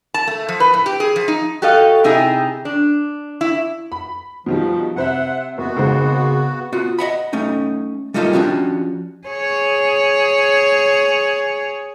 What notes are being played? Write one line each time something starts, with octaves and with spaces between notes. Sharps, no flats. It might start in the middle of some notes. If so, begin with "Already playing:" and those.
A5
A3
F3
B4
A2
G4
G#4
F3
D#4
F#4 G4 A4 D#5 F5
C3 D#4 E4 G4 G#4
D4
E4
B5
B2 D#3 F3 G3
C3 C5 E5 F#5
F#1 B3 F#4
G#1 C#3 G#3 C5
B3 F4 F#4
D#5 E5 F#5 B5
A3 C#4 D#4
G3 A3 A#3 D#4 F4 A4
F3 C#4 D4 F#4 G4
G#4 C#5